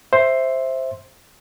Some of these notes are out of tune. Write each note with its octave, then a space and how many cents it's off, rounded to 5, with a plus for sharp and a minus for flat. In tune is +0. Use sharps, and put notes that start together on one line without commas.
C5 +5 E5 +0